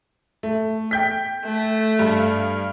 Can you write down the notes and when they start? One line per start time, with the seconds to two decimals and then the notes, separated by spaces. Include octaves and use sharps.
0.43 A3
0.91 G5 G6 B6
1.45 A3
1.99 G2